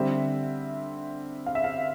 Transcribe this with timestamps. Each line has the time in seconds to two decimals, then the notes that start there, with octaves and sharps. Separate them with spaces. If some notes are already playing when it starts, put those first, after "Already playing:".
Already playing: D3 G3 C4 E5
1.46 F5
1.55 E5
1.64 F5